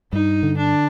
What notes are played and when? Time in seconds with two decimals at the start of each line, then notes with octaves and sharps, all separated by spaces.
0.12 G2 D#4
0.43 D3
0.57 D4